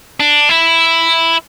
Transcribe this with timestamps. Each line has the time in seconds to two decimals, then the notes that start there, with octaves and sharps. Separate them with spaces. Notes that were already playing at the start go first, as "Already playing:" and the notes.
0.20 D4
0.49 E4